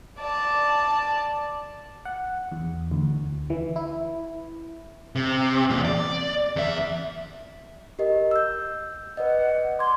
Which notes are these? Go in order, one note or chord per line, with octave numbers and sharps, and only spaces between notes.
D5 A5
F#5
E2
D2
E3
E4
C3
E2 A#2
D5
E2 E5
G4 A#4 D#5
E6 G6
B4 D5 D#5 F#5
C6 D6 G#6